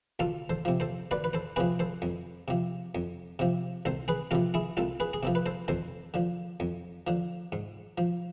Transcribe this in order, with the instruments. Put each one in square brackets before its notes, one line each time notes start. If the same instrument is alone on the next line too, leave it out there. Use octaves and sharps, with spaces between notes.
[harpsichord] D2 F4 A4
A4 C5
C3 F3
A4 C5
D2 B4 D5
B4
A4 C5
C3 F3 G#4 B4
A4 C5
F2
C3 F3
F2
C3 F3
C2 A4 C5
G#4 B4
C3 F3 F4 A4
E4 G#4
C2 F4 A4
G#4 B4
G#4
C3 F3 A4
B4
A4 C5
F2 A4 C5
D3 F3
F2
D3 F3
G#2
F3